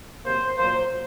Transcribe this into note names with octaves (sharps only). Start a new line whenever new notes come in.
C3 F#3 A#3 C5
A#2 F#3 A#3 C5